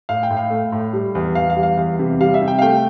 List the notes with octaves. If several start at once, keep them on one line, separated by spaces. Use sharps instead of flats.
A2 F5
G5
A2
F5
A3
A2
G3
E2
E2 F5
F5
G3
F5
E2
C3
G3 F5
E5
C3
G5
F5
A3 G5